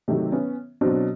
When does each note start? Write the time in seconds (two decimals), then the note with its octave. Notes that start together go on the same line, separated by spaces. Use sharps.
0.08 C3 D#3 F#3 A3
0.32 B3 C#4
0.81 B2 F#3 C4 D4